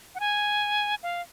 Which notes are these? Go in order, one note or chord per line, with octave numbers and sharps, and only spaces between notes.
F#5
G#5
F5